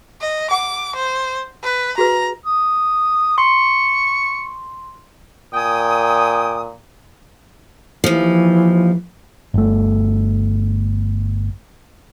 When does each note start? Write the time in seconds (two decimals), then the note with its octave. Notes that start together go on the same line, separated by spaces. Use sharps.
0.21 D#5
0.51 F#5 D6
0.96 C5
1.64 B4
1.98 F#4 G#4 B4 A#5
2.45 D#6
3.38 C6 C#6
5.54 A#2 G5 G#5 D#6
8.04 D#2 E3 F3
9.54 G1 A3